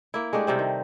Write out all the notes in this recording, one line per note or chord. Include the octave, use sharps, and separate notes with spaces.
A#3 E4
G#3 A3 D4 G4
C3 G3 C4
D#3